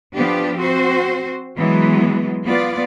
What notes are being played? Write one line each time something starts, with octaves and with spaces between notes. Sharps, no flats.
F3 B3 D4 G4
C4 F#4 C5
E3 F#3 G#3 B3
B3 F4 D5